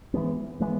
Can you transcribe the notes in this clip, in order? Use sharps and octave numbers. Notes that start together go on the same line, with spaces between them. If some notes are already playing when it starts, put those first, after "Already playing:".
E3 G#3 B3
E3 G#3 B3